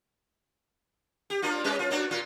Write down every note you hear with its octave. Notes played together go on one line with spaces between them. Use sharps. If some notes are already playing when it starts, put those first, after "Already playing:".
G4
A#3 D4 F4
G3 C#4 B4
F4
A#3 D4 F#4
A#2 F4